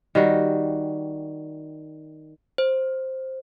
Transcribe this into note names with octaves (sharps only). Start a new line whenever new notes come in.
D#3 G3 F#4
C5